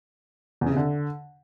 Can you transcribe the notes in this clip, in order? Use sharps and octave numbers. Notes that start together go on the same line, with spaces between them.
E2
C#3
C3
D3